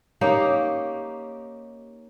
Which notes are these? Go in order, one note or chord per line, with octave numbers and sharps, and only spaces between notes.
A#3 C#4 D#4 G4